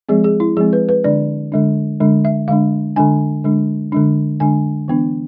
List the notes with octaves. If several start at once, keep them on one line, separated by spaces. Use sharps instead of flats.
F3 G#3 C4 G#4
G#4
E4
F3 G#3 C4 G#4
B4
B4
D3 G#3 D4 D5
D3 G#3 D4
D3 G#3 D4
E5
D3 G#3 D4 F5
D3 G#3 D4 G#5
D3 G#3 D4
D3 G#3 D4
D3 G#3 D4 G#5
E3 B3 D4